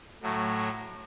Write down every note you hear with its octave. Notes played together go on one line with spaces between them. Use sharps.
A2 F#3 A3